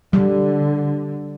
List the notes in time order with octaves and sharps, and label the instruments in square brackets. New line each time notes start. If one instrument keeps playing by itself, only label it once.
[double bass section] D3 [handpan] G3